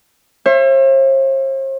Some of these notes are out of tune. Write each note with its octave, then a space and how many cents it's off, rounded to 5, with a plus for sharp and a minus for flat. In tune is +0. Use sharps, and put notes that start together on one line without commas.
C5 +45 E5 +35